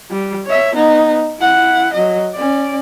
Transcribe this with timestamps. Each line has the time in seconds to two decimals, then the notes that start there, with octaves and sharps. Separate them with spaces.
0.11 G3
0.46 C#5 E5
0.75 B3 D#4
1.39 E4 F#5
1.93 F#3 D#5
2.35 C#4 D5